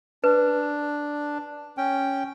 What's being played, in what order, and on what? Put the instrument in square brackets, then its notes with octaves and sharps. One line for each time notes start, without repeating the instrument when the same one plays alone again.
[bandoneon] D4 [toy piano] B4
[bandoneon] C#4 G5